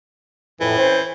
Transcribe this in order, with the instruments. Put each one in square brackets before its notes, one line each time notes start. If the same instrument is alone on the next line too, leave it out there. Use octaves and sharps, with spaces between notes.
[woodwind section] F2 A2 [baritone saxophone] E3
[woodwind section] C4 C#4 C5